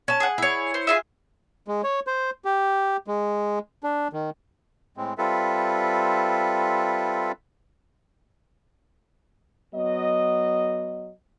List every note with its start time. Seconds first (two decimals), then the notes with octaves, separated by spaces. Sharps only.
0.08 C#4 A5
0.20 G#4 F#5
0.38 E4 C#5
0.74 C5
0.87 F4 G#4 E5
1.68 G#3
1.84 C#5
2.07 C5
2.45 G4
3.08 G#3
3.84 D4
4.13 D#3
4.97 A2 G#3 C4
5.18 G3 C4 F4 A4 B4 E5
9.74 F#3 B3 D#5